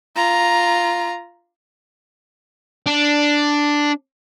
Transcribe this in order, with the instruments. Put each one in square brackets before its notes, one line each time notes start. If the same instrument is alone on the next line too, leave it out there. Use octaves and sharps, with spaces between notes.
[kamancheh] F4 A#5
[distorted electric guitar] D4